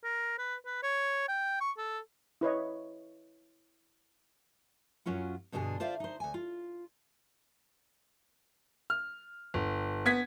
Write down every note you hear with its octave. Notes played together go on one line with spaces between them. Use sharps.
A#4
B4
B4
C#5
G5
C#6
A4
E4 B4 C#5 D#5
F#2 F#3 C#4 F4 F#5
G2 B2 D3 D4 G#4
F4 C5 D5 E5 F5
D#4 C5
D2 G#5
F4
F6
G1
B3 G#6 B6